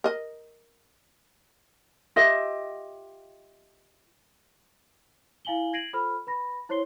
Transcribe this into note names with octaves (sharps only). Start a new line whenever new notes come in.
A#4 D#5
F4 G4 D#5 E5
E4 F5 G#5 F#7 G7
G#6 A#6 C7 D7 D#7 F#7
F4 A4 C5 B5 F6
B4 B5 A#6
E4 C5 C#5 C6 C7 G7